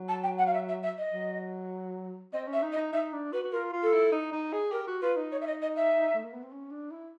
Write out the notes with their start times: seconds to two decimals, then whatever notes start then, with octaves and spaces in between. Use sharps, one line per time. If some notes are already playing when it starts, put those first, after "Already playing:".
Already playing: F#3
0.08 A5
0.23 G5
0.38 F#5
0.46 F5
0.53 E5
0.68 E5
0.83 E5
0.98 D#5
1.13 F#3
2.33 C4 D#5
2.47 C#4
2.53 E5
2.62 D#4
2.72 D#5
2.77 D#4
2.93 D#4 E5
3.12 D4
3.32 F#4 B4
3.43 F#4
3.52 F4 A#4
3.72 F4
3.82 A4
3.93 E4
4.12 D#4
4.32 D#4
4.52 G#4
4.71 G4 A#4
4.87 F#4
5.01 F4 B4
5.16 D#4
5.31 C#5
5.41 E5
5.47 D#5
5.62 D#5
5.76 E5
6.14 A3
6.24 A#3
6.33 B3
6.42 C4
6.52 C#4
6.71 D4
6.91 E4